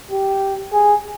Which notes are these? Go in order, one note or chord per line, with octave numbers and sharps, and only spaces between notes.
G4
G#4